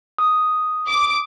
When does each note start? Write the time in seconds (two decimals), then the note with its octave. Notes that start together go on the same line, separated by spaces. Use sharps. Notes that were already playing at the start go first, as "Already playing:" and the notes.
0.18 D#6
0.89 D6